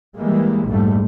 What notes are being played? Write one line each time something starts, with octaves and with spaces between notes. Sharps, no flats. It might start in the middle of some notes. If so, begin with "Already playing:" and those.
E3 G3 G#3 A#3
A#1 F2 G#2 G3 A3